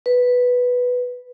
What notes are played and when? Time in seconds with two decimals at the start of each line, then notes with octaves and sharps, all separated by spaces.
0.06 B4